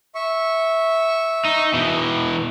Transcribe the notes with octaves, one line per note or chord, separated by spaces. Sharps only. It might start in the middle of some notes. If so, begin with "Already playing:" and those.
E5 C#6
D#4
B2 E3